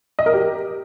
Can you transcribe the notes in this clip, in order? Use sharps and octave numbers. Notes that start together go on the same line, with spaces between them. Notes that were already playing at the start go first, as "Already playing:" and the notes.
D#5
A#4
G4